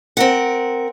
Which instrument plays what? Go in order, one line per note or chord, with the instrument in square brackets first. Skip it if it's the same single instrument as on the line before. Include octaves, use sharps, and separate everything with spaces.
[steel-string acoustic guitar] C4 A#4 F#5